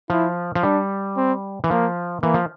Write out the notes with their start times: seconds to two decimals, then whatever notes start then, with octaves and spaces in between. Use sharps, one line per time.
0.10 F3 E4
0.55 F3
0.63 G3 D4
1.17 C4
1.64 E3
1.70 F3 A#3
2.23 E3 A#3
2.34 F3